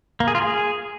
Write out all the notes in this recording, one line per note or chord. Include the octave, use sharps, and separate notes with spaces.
A#3
G#4
F4
G#4